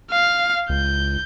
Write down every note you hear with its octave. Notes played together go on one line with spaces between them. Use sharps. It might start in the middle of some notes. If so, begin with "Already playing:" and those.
F5
C#2 G6